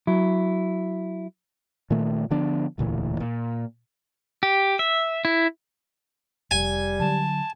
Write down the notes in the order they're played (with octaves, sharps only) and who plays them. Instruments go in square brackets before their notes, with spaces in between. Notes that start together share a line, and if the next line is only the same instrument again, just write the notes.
[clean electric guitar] F#3 E4
[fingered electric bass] A#2 D#3 A3
D3 F3 B3 D4
E1 D2 A#2 E3
A#2
[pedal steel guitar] G4
E5
E4
[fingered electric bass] F1 [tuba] G3 [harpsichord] G#5
[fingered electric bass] D3 F#3 [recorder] A5